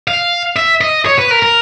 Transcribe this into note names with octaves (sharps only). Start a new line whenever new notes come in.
F5
E5
D#5
C#5
B4
A#4
A#4